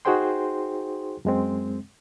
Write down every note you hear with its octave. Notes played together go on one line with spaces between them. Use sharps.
D#4 F#4 G#4 C5 G5 C6
F#2 G#3 C4